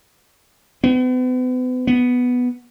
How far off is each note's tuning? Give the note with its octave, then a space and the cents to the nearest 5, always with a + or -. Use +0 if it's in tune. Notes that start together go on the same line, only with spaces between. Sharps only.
B3 +40
B3 +0